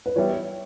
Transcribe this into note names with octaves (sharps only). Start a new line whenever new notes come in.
B4
E3 G3 B3 E4 C#5